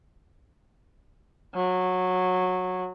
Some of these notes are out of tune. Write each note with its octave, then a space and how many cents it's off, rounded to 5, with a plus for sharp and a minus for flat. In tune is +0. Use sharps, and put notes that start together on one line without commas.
F#3 -15